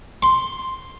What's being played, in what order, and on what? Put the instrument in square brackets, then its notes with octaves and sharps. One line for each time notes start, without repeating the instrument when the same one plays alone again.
[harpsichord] C6